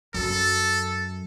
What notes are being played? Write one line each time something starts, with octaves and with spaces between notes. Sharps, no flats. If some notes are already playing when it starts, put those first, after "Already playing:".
F#2 A4